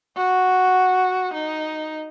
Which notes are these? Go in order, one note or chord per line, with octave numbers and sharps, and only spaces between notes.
F#4
D#4